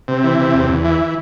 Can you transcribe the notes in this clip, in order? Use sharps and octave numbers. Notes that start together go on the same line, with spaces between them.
C3
E3
C3
E2
E2
E3